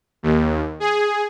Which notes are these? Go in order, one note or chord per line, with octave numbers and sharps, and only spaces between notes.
D#2
G#4